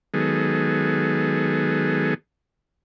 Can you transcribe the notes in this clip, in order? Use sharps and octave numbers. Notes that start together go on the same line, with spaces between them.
D#3 F#3 G#3 B3 G#4 A4